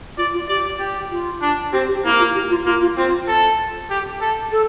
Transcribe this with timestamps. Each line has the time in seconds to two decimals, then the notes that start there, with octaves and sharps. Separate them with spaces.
0.17 F4 D5
0.34 F4
0.49 G4 D5
0.80 G4
1.11 F4
1.42 D4
1.72 C4 G4
1.88 G4
2.04 A#3 E4
2.20 F4
2.35 G4
2.50 F4
2.65 A#3 F4
2.81 F4
2.96 C4 F4
3.28 A4
3.90 G4
4.21 A4
4.52 A4